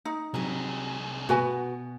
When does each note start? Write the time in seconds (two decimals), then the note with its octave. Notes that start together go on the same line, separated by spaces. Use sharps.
0.05 D#4
0.34 C2 C3 F#3 G#4
1.29 B2 F#4 B4 G#5